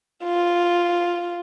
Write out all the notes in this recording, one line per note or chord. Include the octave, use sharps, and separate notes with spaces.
F4